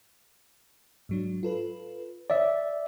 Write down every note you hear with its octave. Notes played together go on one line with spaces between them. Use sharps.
G#2 F#3 D4
F4 A4 B4
C#5 D5 E5